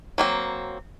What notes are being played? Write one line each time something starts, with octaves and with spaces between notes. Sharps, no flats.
F#3 A#3 C4